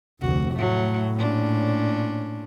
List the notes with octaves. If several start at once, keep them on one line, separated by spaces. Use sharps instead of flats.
F1 D2 F#4
A2 F#3 A3
A#2 C#4 D4